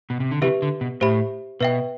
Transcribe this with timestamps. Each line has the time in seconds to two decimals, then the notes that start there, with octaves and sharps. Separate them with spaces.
0.10 B2
0.20 C3
0.31 D3
0.41 C3 E3 G4 B4 E5
0.62 D3
0.81 B2
1.01 A2 G4 C5 E5 B5
1.61 B2 B4 E5 G5